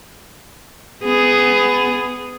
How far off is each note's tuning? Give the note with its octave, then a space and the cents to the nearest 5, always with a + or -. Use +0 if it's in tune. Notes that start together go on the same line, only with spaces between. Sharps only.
B3 +25 G#4 +0